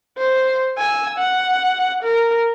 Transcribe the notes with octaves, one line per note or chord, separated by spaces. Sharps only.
C5
G#5 E6
F#5
A#4